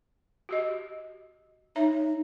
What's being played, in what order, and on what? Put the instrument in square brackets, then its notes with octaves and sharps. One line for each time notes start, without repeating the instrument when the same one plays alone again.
[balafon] F#4 G4 D#5
[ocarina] D#4 [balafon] C#5 E5 A#5